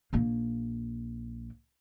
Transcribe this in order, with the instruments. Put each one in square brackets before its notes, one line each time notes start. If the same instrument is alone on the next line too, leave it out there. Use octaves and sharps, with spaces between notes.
[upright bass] A#1 A#3